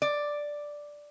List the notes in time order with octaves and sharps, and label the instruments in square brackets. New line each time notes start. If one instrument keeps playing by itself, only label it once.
[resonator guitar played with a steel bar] D5